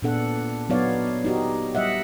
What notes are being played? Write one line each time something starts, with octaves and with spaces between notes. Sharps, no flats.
A#2 B3 D4 A4 F#5
F#3 B3 D#4 C#5 D5 F5
D#4 F#4 G4
G3 D#5 E5 F#5